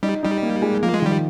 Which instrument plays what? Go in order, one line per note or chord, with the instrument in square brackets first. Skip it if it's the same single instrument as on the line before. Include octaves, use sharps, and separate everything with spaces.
[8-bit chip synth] G3 [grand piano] D#4
[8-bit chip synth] G3 [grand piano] D#4
[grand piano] A#3
G#3
[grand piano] F3 [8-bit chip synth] A#3
[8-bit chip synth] G#3
[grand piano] D#3 [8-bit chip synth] G3